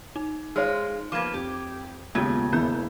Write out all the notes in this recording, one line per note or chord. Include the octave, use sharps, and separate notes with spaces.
D#4
G#3 F4 C5 C#5 F6
F3 A#3 B3 D6 G#6
F2 G4
D#2 A2 C#3 G#3 B3 F4 G4 G#6
E1 E3 A#3 B3 B5 G6